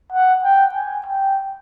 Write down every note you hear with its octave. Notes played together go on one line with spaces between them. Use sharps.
F#5
G5
G#5
G5